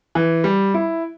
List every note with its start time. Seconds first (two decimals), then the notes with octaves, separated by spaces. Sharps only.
0.15 E3
0.44 G3
0.74 E4